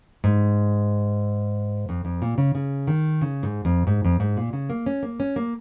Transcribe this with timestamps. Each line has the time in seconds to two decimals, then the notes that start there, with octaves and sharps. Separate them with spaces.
0.24 G#2
1.89 F2
2.05 F2
2.22 A#2
2.38 C#3
2.55 C#3
2.87 D#3
3.21 C#3
3.43 G#2
3.65 F2
3.87 G#2
4.05 F2
4.20 G#2
4.37 A#2
4.53 C#3
4.70 A#3
4.86 C#4
5.03 A#3
5.20 C#4
5.36 A#3